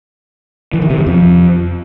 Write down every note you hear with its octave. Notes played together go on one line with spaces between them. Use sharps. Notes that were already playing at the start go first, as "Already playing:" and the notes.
E3
D#3
C3
F#2
F2